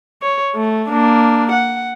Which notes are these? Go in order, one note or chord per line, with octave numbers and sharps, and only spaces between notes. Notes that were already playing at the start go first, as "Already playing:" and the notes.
C#5
A3
A#3 D4
F#5